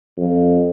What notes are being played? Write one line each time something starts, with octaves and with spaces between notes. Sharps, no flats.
F2